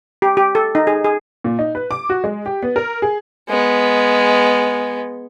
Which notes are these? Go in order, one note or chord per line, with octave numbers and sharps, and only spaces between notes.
G4
G4
A4
D#4
G#4
G#4
A#2
D#4
B4
D6
F#4
G#3
G4
B3
A#4
G#4
G#3 B3